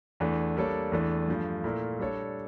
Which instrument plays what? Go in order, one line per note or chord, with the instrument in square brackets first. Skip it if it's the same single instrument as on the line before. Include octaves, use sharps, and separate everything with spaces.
[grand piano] E2 E3 A3 D4
G3 A#3 D4 A4 C#5
E2 E3 A3 D4
G2 F3 A3
A#2 A3 E4 A#4
G3 D4 A4 C#5